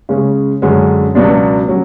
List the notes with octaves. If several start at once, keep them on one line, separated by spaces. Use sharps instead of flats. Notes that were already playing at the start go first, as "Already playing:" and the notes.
C#3 G#3 C#4
F#2 D3 G#3 C#4
C#2 B2 F#3 B3 D4
F#3 C#4